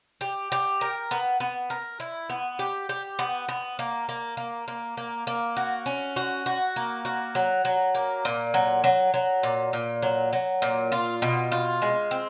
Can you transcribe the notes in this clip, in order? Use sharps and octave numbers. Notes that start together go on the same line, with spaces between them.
G4
G4
A#4
B3
B3
A#4
E4
B3
G4
G4
B3
B3
A#3
A#3
A#3
A#3
A#3
A#3
F#4
C#4
F#4
F#4
A#3
F#4
F#3
F#3
A#3
A#2
F#3
F#3
F#3
A#2
A#2
F#3
F#3
A#2
F4
B2
F4
G#3
C4